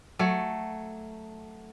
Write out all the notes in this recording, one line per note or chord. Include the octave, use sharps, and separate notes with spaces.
F#3 A3